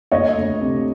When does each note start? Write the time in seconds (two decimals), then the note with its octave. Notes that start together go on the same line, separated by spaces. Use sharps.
0.12 D2 C#5 D#5
0.37 D2
0.61 C3